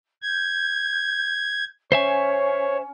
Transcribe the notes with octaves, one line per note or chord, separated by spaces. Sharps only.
G6 G#6
C#4 C5 C#5 E5 G#5